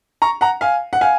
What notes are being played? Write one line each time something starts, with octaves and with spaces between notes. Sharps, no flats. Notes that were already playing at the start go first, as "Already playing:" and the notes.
A#5 C#6
F#5 A#5
F5 G#5
F#5
F5 G#5